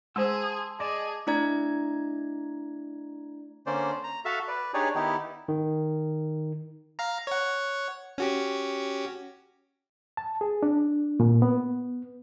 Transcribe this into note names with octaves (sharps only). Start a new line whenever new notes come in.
G#3 G#4 C5 A5 C6 E6
G#4 D5 D#5 A5
A3 D4 E4 D5 A#5 G#6
D3 A#3 C#4 C5 D5
A#5
F#4 A4 E5 F5 A5
B4 D5
D4 D#4 G4 G#4 C#5 D5
D#3 B3 D#4 E4 G4
D#3
F5 A#5
C#5 F#5
C#4 F#4 G4
A5
G#4
D4
A#2
B3